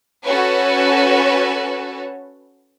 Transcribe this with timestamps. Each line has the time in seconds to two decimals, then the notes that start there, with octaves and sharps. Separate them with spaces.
0.24 C#4 F#4 A4 B4 C#5